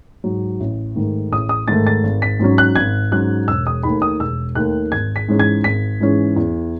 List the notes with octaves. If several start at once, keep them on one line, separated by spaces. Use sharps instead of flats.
G#2 F#3
A1
G#2 D#3 A3
A1 D#6
D#6
G#2 D#3 A3 A6
A6
G#1
B6
G#2 F#3 C#4
F#6
G#1 G#6
G#2 F#3 C#4 F#6
E1 E6
D#6
D#2 D#3 A3 B5
D#6
E1 E6
D#2 D#3 A3 F#6
G#1 G#6
B6
G#2 E3 G#3 C#4
G#6
G#1 B6
G#2 E3 G#3 C#4
E2